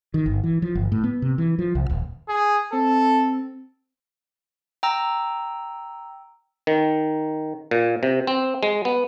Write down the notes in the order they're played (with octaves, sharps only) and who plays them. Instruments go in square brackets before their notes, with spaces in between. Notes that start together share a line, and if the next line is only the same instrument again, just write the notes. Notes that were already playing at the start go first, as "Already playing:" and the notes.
[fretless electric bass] D#3
G1
E3
F3
G1
A2
B3
C3
E3
F3
C2
D#1
[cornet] G#4
[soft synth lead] C4 [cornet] A4
[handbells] G5 A#5 E6
[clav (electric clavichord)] D#3
A#2
C3
C4
G#3
B3